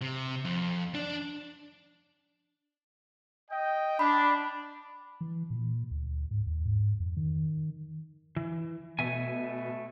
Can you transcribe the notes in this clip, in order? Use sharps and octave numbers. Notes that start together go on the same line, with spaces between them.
C3
F2
D4 D5
D#5 G5
D4 B5
E3
A#2
D2
G#2
D#2
G#2
F2
D#3
E3
B2 A3 E5 G#5